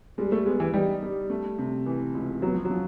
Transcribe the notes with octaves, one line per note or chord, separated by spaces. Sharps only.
G3 G#3
A3
G#3 B3
E3
G3 D#4
G3
A3
C3
E3
C#2
F#3 B3
F3
F#3
F3